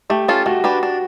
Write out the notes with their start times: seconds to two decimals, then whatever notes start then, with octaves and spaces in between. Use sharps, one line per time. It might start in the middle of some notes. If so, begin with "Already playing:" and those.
0.10 A3 G4
0.28 C#4 F4 A4
0.46 A3 F#4
0.64 D4 G4 B4
0.83 D4